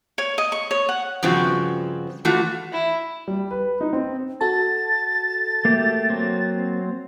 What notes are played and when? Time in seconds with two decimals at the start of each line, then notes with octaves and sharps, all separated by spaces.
0.18 C#5
0.38 D#5
0.52 C#6
0.71 C#5
0.89 F#5
1.23 G2 C#3 F3 C4 F#4
2.25 E3 A3 F4 F#4
2.72 E4
3.28 G3
3.51 B4
3.81 D#4
3.93 C4
4.41 F#4 A4 A5 A6
5.65 A3 A#3 G4
6.10 F#3 C4